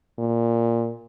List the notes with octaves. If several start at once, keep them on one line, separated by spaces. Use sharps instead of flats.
A#2